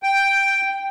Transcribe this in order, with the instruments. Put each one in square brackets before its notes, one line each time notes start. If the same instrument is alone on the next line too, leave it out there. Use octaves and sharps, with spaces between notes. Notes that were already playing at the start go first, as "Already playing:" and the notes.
[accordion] G5